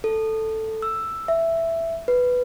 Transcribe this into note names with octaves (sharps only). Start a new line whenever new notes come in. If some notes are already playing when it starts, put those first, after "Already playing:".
A4
E6
E5
B4